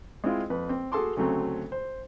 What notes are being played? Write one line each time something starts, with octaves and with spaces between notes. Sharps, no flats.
G#3 C4 E4 F4
F2 B4
C4
F#4 G#4 A4 A5 C6 D6
D2 C#3 F#3 A3 C4
C5